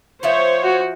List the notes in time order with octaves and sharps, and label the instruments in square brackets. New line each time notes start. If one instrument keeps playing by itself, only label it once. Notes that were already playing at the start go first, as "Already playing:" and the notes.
[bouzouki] F3 E5 F#5 [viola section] C5 C#5
[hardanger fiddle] F#4